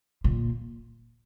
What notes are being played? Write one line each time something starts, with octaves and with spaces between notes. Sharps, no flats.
A#2